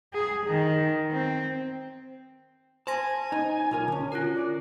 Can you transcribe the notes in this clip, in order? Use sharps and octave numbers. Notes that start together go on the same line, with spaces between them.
G#4
D#3
C4
C5 G#5 A5 C6 A#6
D#4
B1 F4 A#4
D3 C#4
F4 F#4 A#4
D5